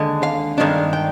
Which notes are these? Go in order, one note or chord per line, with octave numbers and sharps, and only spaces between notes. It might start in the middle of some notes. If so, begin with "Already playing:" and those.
Already playing: D#2 D3 G#3
F5
G2 D#3 G#3 D4
G5